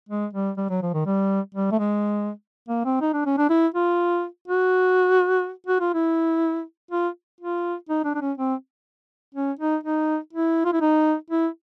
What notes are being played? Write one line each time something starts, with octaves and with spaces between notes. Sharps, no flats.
G#3
G3
G3
F#3
F3
D#3
G3
G3
A3
G#3
A#3
C4
D#4
D4
C#4
D4
E4
F4
F#4
F#4
F4
E4
F4
F4
D#4
D4
D4
C#4
C4
C#4
D#4
D#4
E4
F4
E4
D#4
E4